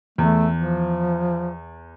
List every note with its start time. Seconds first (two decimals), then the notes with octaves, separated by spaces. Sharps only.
0.18 E2 A3
0.56 F3